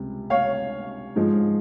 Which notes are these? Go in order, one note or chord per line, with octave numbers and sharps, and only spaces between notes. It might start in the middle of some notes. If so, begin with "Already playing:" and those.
Already playing: C#2 C3 G3
C#5 F5
G#2 F3 G#3